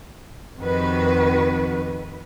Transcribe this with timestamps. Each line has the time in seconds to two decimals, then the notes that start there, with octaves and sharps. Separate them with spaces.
0.58 F2 C3 D#3 F#4 B4